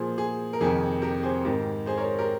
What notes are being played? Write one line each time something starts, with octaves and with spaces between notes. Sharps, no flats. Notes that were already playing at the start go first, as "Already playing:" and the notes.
Already playing: A#2 F3 G#4 C5
G#4
A#4
F2 C3 D#3 G#4
G4 A#4
G#4 C5
G#2 D#3 G4 A#4
G#4 C5
A#4 C#5
G4 A#4